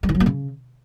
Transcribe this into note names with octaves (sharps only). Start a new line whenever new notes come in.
G3
E3
F#3
A#3
C#3